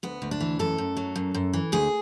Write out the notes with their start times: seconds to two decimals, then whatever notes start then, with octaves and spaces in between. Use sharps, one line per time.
0.03 D2 B3
0.22 D2
0.31 D4
0.40 E3
0.59 F#2 A4
0.78 F#2
0.97 F#3
1.16 F#2
1.34 F#2
1.54 E3
1.72 D2 G#4